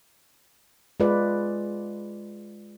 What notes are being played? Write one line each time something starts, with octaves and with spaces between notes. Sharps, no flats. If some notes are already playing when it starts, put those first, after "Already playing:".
G#3 F4 B4 D5